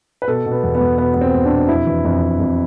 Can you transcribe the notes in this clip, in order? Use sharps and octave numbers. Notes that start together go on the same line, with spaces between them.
B4
B2 A4
B2
B3
E2
B3
E2
B2 B3
E2 B3
C4
E2
D4
B2
F2 E4
E3
F2
F2
F2